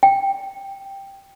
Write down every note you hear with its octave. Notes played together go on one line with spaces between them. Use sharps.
G5